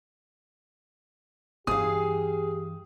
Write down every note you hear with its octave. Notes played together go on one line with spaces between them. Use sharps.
G2 E3 G4 G#4 F5 D#6